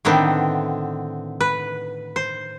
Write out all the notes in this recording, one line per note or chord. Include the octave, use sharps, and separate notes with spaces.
A2 D3 D#3 B3 C4
B4
C5